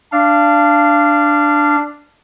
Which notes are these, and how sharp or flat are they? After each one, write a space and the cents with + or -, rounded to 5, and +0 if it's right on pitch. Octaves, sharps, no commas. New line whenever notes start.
D4 +0 F5 -20